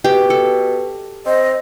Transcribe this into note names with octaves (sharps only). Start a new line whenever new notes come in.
B2 G4
A4
C4 D#5